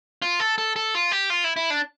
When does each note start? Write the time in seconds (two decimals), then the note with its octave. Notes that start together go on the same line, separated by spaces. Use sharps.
0.22 F4
0.40 A4
0.58 A4
0.76 A4
0.95 F4
1.12 G4
1.30 F4
1.44 E4
1.56 E4
1.70 D4